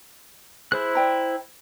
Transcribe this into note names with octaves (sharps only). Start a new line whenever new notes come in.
E4 G#4 C5 F#6
D5 G5 A#5